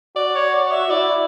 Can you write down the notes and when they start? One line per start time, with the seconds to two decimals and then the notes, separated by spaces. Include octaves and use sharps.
0.16 F#4 D5
0.35 C#5
0.54 D5
0.72 E5
0.90 E4 D5